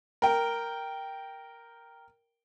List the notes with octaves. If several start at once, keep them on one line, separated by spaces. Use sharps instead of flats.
A#4 G5